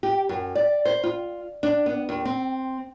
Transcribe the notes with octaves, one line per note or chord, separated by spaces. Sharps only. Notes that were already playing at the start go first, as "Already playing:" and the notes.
G4
F#2
D5
C5
F4
D4
B3
D#2
C4